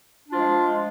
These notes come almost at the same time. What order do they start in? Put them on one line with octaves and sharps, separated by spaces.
D4 F4 F3 G#3